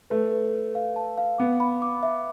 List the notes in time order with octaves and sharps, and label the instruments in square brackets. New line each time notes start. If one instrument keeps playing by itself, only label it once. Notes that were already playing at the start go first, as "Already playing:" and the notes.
[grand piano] A3 [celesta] B4
[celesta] B4
B4
F5
A5
F5
[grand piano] B3 [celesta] D6
[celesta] B5
D6
E5